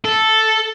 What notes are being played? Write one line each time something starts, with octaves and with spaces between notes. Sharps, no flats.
A4